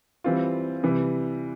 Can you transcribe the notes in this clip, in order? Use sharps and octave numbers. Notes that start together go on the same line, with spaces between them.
E3 G3 C4 F4
C3 E3 G3